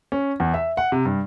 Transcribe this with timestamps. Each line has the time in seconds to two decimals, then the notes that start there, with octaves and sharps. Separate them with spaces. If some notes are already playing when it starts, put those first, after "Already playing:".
0.12 C#4
0.40 E2
0.54 E5
0.77 F#5
0.92 C3
1.05 G2